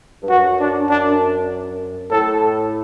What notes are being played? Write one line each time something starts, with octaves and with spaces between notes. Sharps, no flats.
G2
F#2 F#4
D4
D4
A2 A4